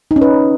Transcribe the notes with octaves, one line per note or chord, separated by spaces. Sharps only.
D#4
C#4
B4